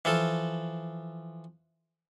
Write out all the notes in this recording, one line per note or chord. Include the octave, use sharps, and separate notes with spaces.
E3 F3 A4